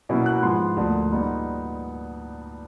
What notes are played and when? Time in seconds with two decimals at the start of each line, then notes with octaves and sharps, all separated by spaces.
0.09 B2 F#3 A#3 C#4 E4
0.26 F#6
0.43 G#2 F3 G#3 B3 C6
0.76 D2 D3 F3 A#3
1.10 A#2 G3 B3 D#4